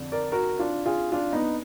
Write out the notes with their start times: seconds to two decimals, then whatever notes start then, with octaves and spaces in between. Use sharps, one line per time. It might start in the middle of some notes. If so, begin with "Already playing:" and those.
Already playing: F2 D3
0.12 A#4 D5
0.32 F#4 A#4
0.59 D4 F4
0.86 F4 G#4
1.12 D4 F4
1.32 B3 D#4